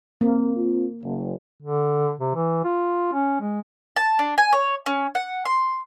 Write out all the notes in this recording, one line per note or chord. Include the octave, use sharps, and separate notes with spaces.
A#3 C4
C4 F4
F#1
D3
C3
E3
F4
C#4
G#3
A5
D4
G#5
C#5
C#4
F#5
C6